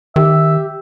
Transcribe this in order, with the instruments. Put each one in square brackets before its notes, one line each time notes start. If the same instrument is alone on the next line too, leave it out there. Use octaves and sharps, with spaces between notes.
[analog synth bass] D#3 [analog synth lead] G4 [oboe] E5